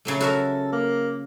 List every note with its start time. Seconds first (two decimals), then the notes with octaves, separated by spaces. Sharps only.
0.05 C#3 F#3 A3
0.20 F#4 A4 A#4 E5
0.72 A#3